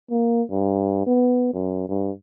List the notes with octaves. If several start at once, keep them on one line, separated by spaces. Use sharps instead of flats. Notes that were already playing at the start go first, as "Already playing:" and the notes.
A#3
G2
B3
F#2
G2